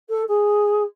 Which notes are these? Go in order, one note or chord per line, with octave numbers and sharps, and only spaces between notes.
A4
G#4